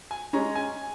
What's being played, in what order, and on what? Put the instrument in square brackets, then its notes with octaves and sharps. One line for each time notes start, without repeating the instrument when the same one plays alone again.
[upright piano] G#5
[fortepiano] G#3 C#4 [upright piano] A#5
[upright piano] G#5